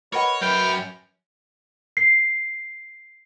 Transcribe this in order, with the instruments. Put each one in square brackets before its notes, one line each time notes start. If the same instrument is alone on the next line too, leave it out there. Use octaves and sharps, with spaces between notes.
[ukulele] A#4 D#5 F#5 [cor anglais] B4 [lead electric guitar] C#5
[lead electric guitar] F#2 [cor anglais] B4 [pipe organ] G5 F6 G6
[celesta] C7